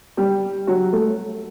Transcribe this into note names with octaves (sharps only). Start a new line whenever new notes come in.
G3 G4
F#3 F#4
A3 A4